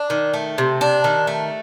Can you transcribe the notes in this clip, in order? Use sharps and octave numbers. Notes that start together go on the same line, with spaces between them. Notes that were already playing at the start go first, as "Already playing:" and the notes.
Already playing: D4
D#3
A3
C3
D4
D#3
A3